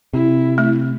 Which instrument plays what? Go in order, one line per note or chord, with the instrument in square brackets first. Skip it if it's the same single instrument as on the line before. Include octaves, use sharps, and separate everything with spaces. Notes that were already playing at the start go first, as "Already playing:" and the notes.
[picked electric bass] C3 [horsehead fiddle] E4
[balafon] A3